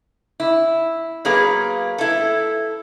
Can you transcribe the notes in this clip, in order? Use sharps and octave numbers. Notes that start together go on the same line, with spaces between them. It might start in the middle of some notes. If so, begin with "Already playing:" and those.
E4
F#3 A#3 G#4 B4 F5
E4 A4